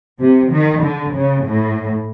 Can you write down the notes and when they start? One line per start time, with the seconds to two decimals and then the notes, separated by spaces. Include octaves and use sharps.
0.20 C3
0.51 D#3
0.82 D3
1.14 C#3
1.45 A2